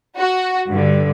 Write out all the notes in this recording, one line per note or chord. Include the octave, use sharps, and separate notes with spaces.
F#4
G2 D3